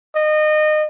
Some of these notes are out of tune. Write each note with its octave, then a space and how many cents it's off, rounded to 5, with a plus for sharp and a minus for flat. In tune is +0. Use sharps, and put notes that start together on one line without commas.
D#5 -25